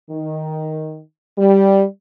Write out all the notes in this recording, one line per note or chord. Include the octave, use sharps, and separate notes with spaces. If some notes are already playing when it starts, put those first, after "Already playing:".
D#3
G3